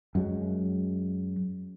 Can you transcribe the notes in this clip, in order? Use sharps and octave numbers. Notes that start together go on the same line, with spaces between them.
F#2 F#3 G#3